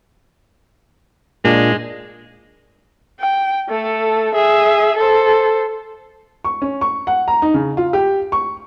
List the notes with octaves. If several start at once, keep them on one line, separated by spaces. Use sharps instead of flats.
A#2 G#3 D4
G5
A3 A4
G#4 E5
A4 C5
C#6
C#4
C#6
F#5
A#5
D#4
C#3
F4
G4
C#6